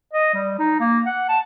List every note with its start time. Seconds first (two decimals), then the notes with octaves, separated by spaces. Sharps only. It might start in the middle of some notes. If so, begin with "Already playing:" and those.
0.13 D#5
0.34 G3
0.59 D#4
0.80 A#3
1.06 F#5
1.29 A5